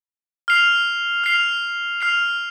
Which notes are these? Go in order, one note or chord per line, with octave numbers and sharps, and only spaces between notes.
F6 C7 F7
F6 C7 F7
F6 C7 F7